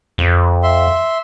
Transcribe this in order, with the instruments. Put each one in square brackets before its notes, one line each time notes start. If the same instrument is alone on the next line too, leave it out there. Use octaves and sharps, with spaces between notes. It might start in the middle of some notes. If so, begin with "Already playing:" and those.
[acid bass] F2
[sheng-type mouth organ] E5 C6